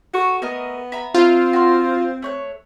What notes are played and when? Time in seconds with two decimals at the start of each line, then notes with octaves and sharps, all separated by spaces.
0.14 F#4 A4 C#6
0.42 A3 B3 A#4 D#5
0.92 E5 A#5 B5
1.14 C4 F4
1.53 F#4 C6
2.22 A3 C#5 F#6